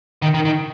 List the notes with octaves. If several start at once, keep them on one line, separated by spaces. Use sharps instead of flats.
D#3
D#3
D#3